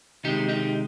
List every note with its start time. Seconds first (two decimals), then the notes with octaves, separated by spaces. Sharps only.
0.24 C3 D#3 G#3 D#4 G4
0.49 D#4 G4